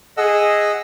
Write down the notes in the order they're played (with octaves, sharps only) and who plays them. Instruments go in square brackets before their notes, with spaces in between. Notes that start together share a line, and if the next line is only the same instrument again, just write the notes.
[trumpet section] G#4 [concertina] D#5 F#5 E6